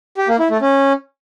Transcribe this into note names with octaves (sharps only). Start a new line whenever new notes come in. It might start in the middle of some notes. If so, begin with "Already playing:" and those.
G4
A#3
E4
A3
C#4